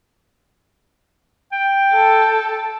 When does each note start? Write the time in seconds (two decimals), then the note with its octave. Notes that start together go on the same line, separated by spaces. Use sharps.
1.52 G5
1.92 A4